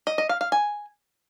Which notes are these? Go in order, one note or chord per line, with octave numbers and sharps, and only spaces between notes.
D#5
D#5
F5
F5
G#5